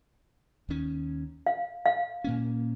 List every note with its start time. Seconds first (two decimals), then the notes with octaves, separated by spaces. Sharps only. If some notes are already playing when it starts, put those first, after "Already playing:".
0.69 D#2 D#3 C#4
1.46 F5
1.85 F5
2.24 A#2 A#3 C#4